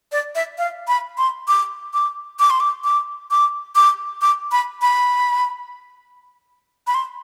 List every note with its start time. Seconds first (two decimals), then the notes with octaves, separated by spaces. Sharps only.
0.12 D5
0.35 E5
0.58 F5
0.88 B5
1.18 C6
1.48 D6
1.94 D6
2.40 D6
2.50 C6
2.60 D6
2.84 D6
3.31 D6
3.76 D6
4.22 D6
4.52 B5
4.82 B5
6.87 B5
6.94 C6